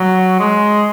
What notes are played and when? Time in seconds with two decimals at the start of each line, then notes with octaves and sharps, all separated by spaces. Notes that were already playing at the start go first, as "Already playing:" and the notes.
Already playing: F#3
0.39 G#3